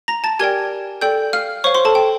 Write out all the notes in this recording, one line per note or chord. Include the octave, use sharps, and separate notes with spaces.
A#5 A#6
A5 A6
G4 A#4 D5 G5 G#5 G#6
A4 D5 G5 G6
F5 F6
C5 C#5 F5 C#6
C5 C6
A4 A5
G5